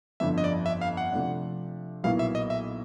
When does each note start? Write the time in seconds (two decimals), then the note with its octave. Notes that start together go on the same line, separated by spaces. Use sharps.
0.20 G1 F2 D3 F3 E5
0.38 D#5
0.44 D5
0.66 E5
0.81 F5
0.97 F#5
1.12 C3 F3 A3 D4
2.03 B1 A#2 F#3 B3 E4 F5
2.19 E5
2.35 D#5
2.50 E5